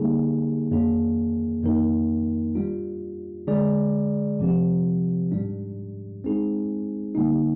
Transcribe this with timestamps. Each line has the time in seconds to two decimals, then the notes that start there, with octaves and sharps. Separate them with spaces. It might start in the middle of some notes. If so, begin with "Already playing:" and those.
Already playing: D3 G3 A#3 D#4 G#4
0.71 F2 D#3 A#3 D4 G#4
1.63 F2 D#3 A#3 D#4 A#4
2.55 G3 D4 F4
3.47 D3 G#3 D4 G#4 D5
4.39 C3 F3 C4 G4
5.32 G#2 G3 D4
6.24 G#3 C4 D#4 G#4
7.15 D3 G3 A#3 D#4